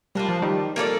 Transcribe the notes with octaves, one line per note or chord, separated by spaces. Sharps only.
G3 A#3 D4 F4
F3
D#3 G3
A#3 F4 A4 D5